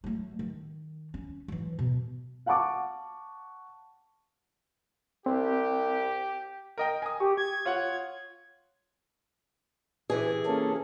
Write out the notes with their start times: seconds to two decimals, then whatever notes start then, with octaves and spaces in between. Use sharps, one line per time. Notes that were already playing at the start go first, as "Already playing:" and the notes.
0.04 F#3 A3
0.39 D#3
1.14 C#4
1.48 E3 F#3
1.79 B2
2.46 F5 F#5 A5 C#6 D6
5.26 C2 C4 G4
6.78 A#4 D#5 G5
7.02 G#5 D#6
7.20 G4 C#6
7.37 G#6
7.65 F4 C#5 F#5
10.10 C3 E3 G#4
10.46 A#3 C#4 A4